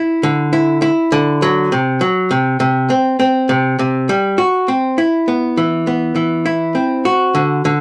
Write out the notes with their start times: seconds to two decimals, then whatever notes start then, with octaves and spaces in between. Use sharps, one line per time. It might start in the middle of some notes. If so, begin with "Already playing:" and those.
Already playing: E4
0.23 D3
0.53 E4
0.82 E4
1.12 D3
1.42 F#3
1.72 C3
2.01 F#3
2.31 C3
2.60 C3
2.90 C4
3.20 C4
3.49 C3
3.79 C3
4.09 G3
4.38 F#4
4.68 C4
4.98 E4
5.28 B3
5.57 E3
5.87 B3
6.16 E3
6.46 E4
6.75 C4
7.05 F#4
7.35 D3
7.65 D3